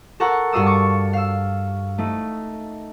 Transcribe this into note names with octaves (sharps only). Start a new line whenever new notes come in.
A4 A#4 F#5 A#5 C#6 F#6
G2 F#4 F5 D#6 E6
C#6 D6 A6
F5 E6
A3 D#4